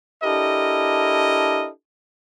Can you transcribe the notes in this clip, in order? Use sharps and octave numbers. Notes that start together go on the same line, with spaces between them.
D4 E4 G4 A4 A#4 D#5